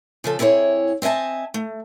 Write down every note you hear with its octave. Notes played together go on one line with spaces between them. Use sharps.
C#3 F3 A4
C3 E4 G#4 A#4 C#5
C4 D#5 E5 G#5 A5
A3